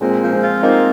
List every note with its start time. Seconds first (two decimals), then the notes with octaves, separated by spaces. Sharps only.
0.01 A#2 G#3 C4
0.21 F3
0.33 G#3 C4
0.42 F4
0.63 A#3 C4 D#4